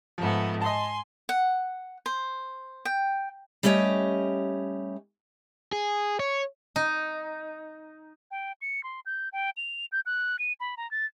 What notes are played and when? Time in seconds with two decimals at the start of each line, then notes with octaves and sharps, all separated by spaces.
0.18 G#2 F3 A3 B3
0.61 D#5 G#5 A5 C6
1.29 F#5
2.06 C5
2.85 G5
3.63 G3 A3 C#4 G4 C#5 D#5
5.73 G#4
6.20 C#5
6.76 D#4
8.31 G5
8.61 C#7
8.83 C6
9.06 G6
9.32 G5
9.57 F7
9.92 G6
10.06 F#6
10.39 D#7
10.60 B5
10.77 A#5
10.91 A6